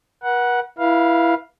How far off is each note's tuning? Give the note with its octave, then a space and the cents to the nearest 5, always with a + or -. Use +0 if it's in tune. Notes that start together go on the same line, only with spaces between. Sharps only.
B4 -45 F#5 +0
E4 +10 B4 -25 F5 +0